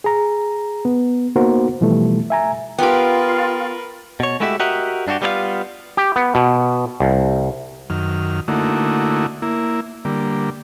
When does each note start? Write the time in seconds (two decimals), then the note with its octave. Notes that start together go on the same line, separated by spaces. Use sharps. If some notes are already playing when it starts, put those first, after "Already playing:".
0.04 G#4 A#5
0.85 B3
1.36 A#3 B3 D#4 F#4 A#4 C5
1.81 B2 E3 F3 G3 A3
2.30 E5 G#5 A#5
2.78 B3 F4 G4 A#4 B4 G5
4.20 B2 C#5
4.40 G#3 A3 E4 F#4 G4 E5
4.60 F#4 G4 A#4 D#5 E5 F#5
5.07 G2 D4 D#4 F#4 G4
5.22 G3 B3 C4 E4 F4 F5
5.97 G4
6.16 B3
6.35 B2
7.00 C2
7.90 F#2 D#3 F6
8.48 D3 A3 A#3 D#4 E4 F#4
9.42 A#3 E4
10.05 D3 G3 A#3